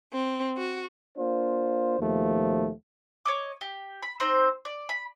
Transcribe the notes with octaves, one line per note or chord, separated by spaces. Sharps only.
C4
F#4
A#3 D4 F4 C5
D#2 B2 F3 A3
C#5 D#5 D6
G4
B5
C4 D#4 C5
D5
B5